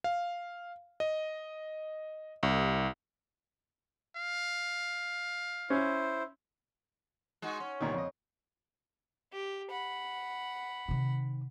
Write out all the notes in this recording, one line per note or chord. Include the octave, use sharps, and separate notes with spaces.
F5
D#5
C2
F5
C#4 E4 C5
G#3 D#4 F#4
C#4
C2 A#2 D#3
F2 D#5
G4
F#5 B5
C3 D#3